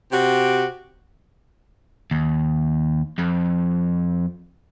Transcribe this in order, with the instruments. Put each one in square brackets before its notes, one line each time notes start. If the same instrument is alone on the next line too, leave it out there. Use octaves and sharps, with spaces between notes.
[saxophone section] C3 F#4 G4
[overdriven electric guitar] D#2
F2